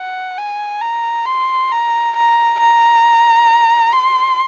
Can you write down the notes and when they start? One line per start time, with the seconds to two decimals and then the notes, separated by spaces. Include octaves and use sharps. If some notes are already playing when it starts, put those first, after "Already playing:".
Already playing: F#5
0.38 G#5
0.82 A#5
1.26 C6
1.72 A#5
2.16 A#5
2.60 A#5
3.92 C6